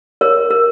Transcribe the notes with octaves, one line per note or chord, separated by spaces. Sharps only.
A#4 C#5
A#4